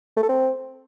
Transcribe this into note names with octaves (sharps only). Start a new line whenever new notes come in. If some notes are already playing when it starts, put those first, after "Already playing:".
A3
A4
C4